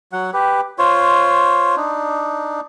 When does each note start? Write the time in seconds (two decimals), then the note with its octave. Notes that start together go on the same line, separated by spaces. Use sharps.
0.12 F#3 F#5
0.33 G4 B4
0.78 F4 C5 C#5
1.76 D4 D#4